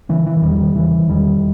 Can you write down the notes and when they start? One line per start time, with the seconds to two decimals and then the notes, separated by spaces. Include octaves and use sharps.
0.09 C#3 E3
0.26 E3
0.37 E3
0.42 E2 D#3 G3
0.76 C#3 E3
1.09 E2 D#3 G3